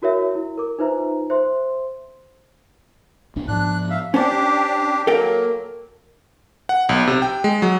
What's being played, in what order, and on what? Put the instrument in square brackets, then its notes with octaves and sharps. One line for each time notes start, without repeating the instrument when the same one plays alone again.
[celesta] E4 F#4 A#4 C#5 E5
E4
A#4 D6
D#4 F4 B4 C5 E5 A#5
C5 E5 C6
[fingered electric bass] B1 D4
[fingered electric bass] G#2 F3 [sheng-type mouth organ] D4 F#6
[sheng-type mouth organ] E5 F5
[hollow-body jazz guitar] C#4 C5 A5 [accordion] D4 G4
[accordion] F#3 A#3 [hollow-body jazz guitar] A4 A#4 G5
[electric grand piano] F#5
B1
C3
G5
G#3
F#3